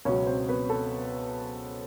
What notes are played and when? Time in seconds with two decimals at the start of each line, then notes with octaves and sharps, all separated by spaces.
0.05 C#2 B2 F#3 C#4 C#5
0.26 C4 C5
0.49 B3 B4
0.70 A4